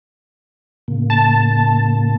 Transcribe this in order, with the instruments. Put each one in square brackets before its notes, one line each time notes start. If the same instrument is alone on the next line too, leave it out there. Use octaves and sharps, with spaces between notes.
[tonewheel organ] A2 C#3 A#3
[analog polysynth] A5